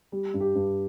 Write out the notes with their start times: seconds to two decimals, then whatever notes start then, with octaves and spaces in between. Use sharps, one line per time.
0.12 G3
0.34 G2
0.41 G4
0.55 G2